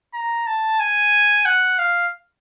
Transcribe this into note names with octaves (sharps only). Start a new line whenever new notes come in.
A#5
A5
G#5
F#5
F5